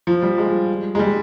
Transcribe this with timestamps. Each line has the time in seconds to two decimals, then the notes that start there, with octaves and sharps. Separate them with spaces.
0.07 F3
0.22 G3
0.38 G#3
0.95 G#3
0.99 G3